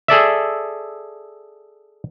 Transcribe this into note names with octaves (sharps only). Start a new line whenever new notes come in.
G#4 A4 D5 E5